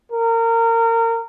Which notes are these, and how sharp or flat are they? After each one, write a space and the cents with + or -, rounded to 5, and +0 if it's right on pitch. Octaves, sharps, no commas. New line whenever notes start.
A#4 -25